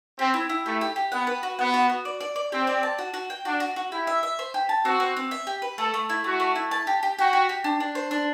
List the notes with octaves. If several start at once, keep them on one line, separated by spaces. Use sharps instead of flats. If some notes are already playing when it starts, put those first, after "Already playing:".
C4 G4
E4
E4
A3 G4
G4
G4
B3 F#5
B4
F#4
B3 F#5
F#4
F#4
D5
D5
D5
C4 G4
D5
A5
F#4
F#4
G5
D4 F#4
F#4
F#4
E4 G4
E5
E5
C5
G4
A5
C4 F#4
C4
C4
E5
G4
B4
A3 A4
A3
E4
A3 F#4
A3
E4
A5
G4
G4
F#4 G4
G4
G4
D4
D4
C5
D4